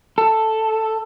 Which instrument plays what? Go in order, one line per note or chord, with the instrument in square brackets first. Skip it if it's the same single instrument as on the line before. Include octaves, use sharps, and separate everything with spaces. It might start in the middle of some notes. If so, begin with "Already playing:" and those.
[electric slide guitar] A4